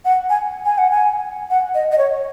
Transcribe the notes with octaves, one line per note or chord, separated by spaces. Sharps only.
F#5
G#5
G#5
F#5
G#5
F#5
D#5
D#5
C#5